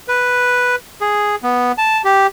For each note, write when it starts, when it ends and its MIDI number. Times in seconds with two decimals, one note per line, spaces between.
0.08 0.76 71
1.01 1.36 68
1.43 1.72 59
1.78 2.02 81
2.05 2.27 67